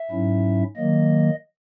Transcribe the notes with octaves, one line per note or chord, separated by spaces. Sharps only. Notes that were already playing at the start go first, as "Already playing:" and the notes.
Already playing: E5
G#2 F#3 C#4 E4
D#3 F#3 A#3 D#5